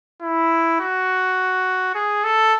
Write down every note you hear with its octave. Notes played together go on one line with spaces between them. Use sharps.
E4
F#4
G#4
A4